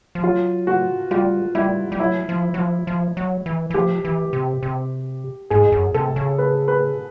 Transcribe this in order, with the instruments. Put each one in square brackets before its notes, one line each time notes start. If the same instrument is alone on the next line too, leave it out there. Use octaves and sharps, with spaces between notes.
[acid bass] F3
[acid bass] F#3 [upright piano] F4
[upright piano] F#4
[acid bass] G3 [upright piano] F4
[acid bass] G3 [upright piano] E4
[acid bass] G3
[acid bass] F#3 [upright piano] E4
[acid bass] F3
F#3
F3
F3
F#3
E3
E3
[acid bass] F3 [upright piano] G4
[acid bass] E3
C3
C3
[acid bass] G#2 [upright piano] G#4
[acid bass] F#2
[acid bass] C3 [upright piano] A4
[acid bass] C#3
[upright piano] B4
B4